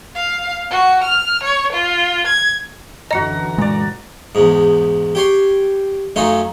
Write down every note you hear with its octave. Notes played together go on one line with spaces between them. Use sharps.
F5
F#4
F6
C#5
F4
G#6
F#2 D3 E3 F#4 D#5 A#5 C#7
A#2 G#3 D5 A#5
E2 G#2
G4 C#5 C6
F#2 A3 C#4 D#4 F4